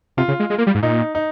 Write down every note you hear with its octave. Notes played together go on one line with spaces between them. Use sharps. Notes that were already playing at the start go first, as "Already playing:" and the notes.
C3 F4
C#3
G#3
G#3
A#3
G3
G#2
A#2 D#4
D#4